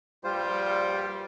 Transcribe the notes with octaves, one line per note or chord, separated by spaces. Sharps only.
A#1 G2 G3 F4 C5